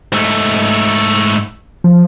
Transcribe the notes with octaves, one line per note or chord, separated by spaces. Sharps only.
G#2 A3
F3